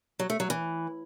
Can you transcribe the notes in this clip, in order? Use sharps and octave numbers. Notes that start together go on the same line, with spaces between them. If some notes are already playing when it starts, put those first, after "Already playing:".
F#3
A3
F#3
E3